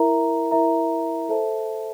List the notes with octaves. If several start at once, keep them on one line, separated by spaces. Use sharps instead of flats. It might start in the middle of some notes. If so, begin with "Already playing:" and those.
Already playing: E4 A#4 E5 A#5
E4 A#4 E5 A#5
A4 C5 E5 A5